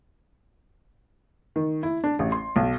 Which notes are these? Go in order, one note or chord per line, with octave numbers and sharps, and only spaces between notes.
D#3
E4
D4
A1
C6
B1